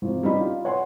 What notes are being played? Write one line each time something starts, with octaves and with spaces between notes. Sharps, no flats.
G#1 F4
G3 C#4 D#4 B5
F4
C#5 F#5 G#5 C6